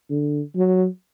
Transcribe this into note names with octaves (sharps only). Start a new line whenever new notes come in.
D3
F#3